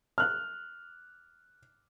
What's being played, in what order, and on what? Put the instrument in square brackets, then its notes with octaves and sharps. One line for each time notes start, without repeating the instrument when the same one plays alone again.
[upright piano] F6 F#6